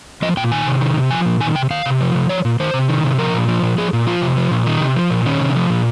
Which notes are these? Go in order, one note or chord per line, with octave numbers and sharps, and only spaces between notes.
F3 D#5
A#2 G5
D#3 G#5
C3
D#3
C3
F3 G#5
A#2
D#3 G#5
C3 G5
D#3 F5
C3
F3
C3
F3 C#5
A#2
D#3 C5
C3
D#3
C3
F3 A#4
A#2
F3
A#2
F3 G#4
A#2
F3 F4
C3
F3
A#2
D#3 D#4
C3
F3
A#2
D#3 C#4
C3
F3
A#2